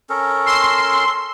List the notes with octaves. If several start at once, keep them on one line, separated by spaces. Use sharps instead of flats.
C#4 A4 A#4
C6 E6 C7